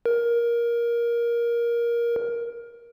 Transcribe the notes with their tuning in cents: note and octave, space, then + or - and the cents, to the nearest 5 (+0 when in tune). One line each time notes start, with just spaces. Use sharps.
A#4 +15